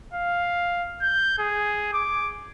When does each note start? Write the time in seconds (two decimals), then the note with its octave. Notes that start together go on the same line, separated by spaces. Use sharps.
0.13 F5
1.02 G6
1.39 G#4
1.93 D6